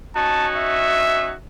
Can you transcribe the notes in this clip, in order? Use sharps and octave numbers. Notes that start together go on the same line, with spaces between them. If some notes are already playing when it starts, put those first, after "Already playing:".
C#4 D#4 F#4 A5
E5